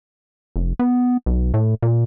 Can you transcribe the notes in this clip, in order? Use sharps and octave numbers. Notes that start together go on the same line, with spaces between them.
F1
B3
B1
A2
A#2